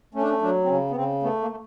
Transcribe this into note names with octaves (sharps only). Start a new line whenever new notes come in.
A3 C#4
D4
C#4
F#3 D4
C4
C#3 C#4
B3
C#3 C4
A3 B3
A#3
A3